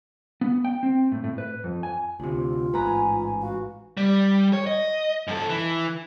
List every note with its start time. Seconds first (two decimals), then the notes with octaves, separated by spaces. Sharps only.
0.41 B3
0.65 G5
0.83 C4
1.12 A2
1.24 A2
1.38 B4
1.64 F2
1.83 G#5
2.20 D2 C3 F4
2.74 A1 G#2 B4 G#5 A#5
3.42 F#4 F5
3.97 G3
4.53 C#5
4.67 D#5
5.27 F#2 A4
5.49 E3